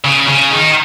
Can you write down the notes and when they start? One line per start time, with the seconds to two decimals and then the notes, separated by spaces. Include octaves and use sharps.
0.04 C#3
0.28 C#3
0.51 D#3